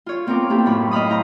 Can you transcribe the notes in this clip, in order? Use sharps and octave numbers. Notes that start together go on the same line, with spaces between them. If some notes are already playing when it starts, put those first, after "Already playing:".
F4 C#5
B3 C4 F4 A#4 D6
A#3 B3 E4 G4 A4
F#2 A2 C#5 B5
D#5 F5 B5 D#6
E4 C5 A#5